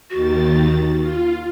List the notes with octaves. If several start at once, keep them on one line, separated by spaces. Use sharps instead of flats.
D#2 D#3 F#4 A6
F4